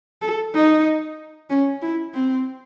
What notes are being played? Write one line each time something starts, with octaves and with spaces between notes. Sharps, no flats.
A4
D#4
C#4
E4
C4